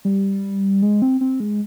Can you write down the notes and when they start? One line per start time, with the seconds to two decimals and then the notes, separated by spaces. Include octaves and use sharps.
0.05 G3
0.82 G#3
1.02 C4
1.21 C4
1.40 G#3